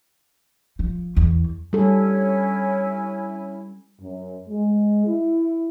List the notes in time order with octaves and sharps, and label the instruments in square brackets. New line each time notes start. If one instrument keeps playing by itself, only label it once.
[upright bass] F3
E2
[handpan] G3 A4 [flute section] C#4 E4 G#5
[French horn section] F#2
G#3
E4